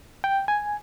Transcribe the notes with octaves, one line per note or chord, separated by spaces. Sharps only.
G5
G#5